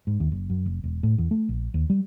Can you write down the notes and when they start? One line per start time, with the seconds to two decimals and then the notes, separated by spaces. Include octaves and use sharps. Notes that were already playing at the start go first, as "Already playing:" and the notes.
0.07 G#2
0.20 D#2
0.32 F#1
0.50 F#2
0.66 F1
0.84 E1
1.03 A2
1.18 E2
1.31 A3
1.49 A#1
1.74 D#2
1.90 G3